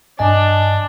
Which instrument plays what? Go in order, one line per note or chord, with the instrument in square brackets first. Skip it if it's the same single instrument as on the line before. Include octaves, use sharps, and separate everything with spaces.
[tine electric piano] G2 D#5 G#5 [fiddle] D4